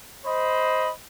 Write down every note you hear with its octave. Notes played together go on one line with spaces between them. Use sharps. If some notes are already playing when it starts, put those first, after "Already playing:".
C5 D#5 B5